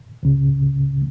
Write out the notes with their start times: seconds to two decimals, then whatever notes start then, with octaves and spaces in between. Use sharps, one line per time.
0.23 C#2 C#3